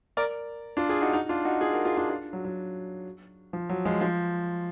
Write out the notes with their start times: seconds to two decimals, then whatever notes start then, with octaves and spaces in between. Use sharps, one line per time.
0.17 A#4 D5
0.77 D4 F4
0.89 F4 G#4
1.02 D#4 F#4
1.13 D#4 F#4
1.29 D4 F4
1.45 D#4 F#4
1.61 F4 G#4
1.73 F#4 A#4
1.85 F4 G#4
1.97 D4 F4
2.09 D4 F4
2.33 F#3
2.45 F#3
3.53 F3
3.69 F#3
3.85 F3 G#3
4.01 F3